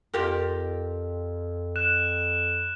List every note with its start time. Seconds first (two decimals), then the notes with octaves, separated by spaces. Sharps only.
0.14 F2 F4 G4 A#4
1.76 F#6 E7